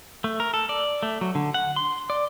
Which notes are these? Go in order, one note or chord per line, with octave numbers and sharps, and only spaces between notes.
A3
A#4
A4
D5
A3
F#3
D3
F#5
C6
D5